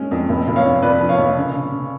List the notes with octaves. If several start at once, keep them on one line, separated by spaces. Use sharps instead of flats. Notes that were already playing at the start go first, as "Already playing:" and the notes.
Already playing: G#3 C#4
F2
F1
F1
C#5 F5
F2
F2 B4 D5
F3
C#5 F5
F1
C#3
C#3
C#3